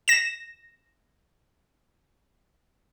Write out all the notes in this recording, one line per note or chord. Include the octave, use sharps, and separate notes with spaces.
A#6 E7